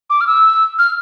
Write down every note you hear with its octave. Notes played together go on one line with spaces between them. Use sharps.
D6
F6
E6
F6